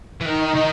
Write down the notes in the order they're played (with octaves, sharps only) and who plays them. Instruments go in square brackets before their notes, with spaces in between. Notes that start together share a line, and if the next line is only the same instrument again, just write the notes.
[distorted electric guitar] E3
[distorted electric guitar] D#3 [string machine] D#4
[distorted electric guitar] D#3